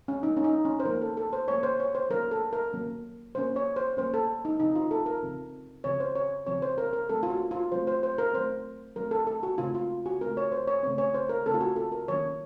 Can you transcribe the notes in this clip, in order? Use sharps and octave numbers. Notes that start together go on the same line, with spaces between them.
C#4
F3 A#3 C#4 D#4
C#4
D#4
C#4
C5
F3 A#3 C#4 A#4
A4
A4
C5
F3 A#3 C#4 C#5
C5
C#5
C5
F#3 A#3 C#4 A#4
A4
A#4
F#3 A#3 C#4
F#3 A#3 C#4 C5
C#5
C5
F#3 A#3 C#4 C5
A4
D#4
C#3 F3 C4 D#4
F4
A4
A#4
C#3 F3 C4
C#3 F3 C4 C#5
C5
C#5
C#3 F3 C4 C#5
C5
A#4
A#4
F#3 A3 C4 A4
F4
F#4
F4
F#3 A3 C4 C5
C5
C5
A#4
F#3 A3 C4 C5
F#3 A3 C4 A#4
A4
A4
F#4
C#3 A3 C4 F4
F4
F#4
C#3 A3 C4 A#4
C#5
C5
C#5
C#3 A3 C4 C#5
C#5
C5
A#4
C#3 A3 C4 A4
F4
F#4
A4
A#4
D#3 F#3 A#3 C#4 C#5